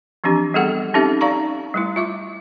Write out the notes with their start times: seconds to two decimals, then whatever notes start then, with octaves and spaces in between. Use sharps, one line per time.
0.24 E3 F3 C4 D4 G4
0.54 G3 B3 G#4 A4 F#5
0.94 C4 C#4 D#4 G4 A4 E5
1.21 D#4 D5 F5 A#5 C#6
1.74 G3 A3 E4
1.96 F4 E5 D6